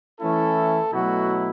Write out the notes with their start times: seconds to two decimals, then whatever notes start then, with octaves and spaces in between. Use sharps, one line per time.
0.20 E3 A3 C#4 E4 A4
0.93 B2 F#3 A3 E4 F#4